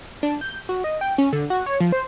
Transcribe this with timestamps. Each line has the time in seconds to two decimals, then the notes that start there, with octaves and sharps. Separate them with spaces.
0.23 D4
0.41 G6
0.69 F#4
0.84 D#5
1.01 G5
1.18 C#4
1.33 D3
1.50 F#4
1.66 C#5
1.80 F3
1.92 C5